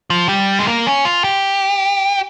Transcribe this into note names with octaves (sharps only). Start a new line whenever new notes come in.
F3
G3
G#3
A#3
C#4
F4
G4